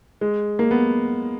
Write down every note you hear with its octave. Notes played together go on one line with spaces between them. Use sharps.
G#3
A#3
B3